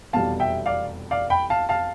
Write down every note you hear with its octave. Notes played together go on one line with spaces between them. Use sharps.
F1 E2 B2 G3 F5 A5
E5 G5
D5 F5
D5 F5
G5 B5
F5 A5
F5 A5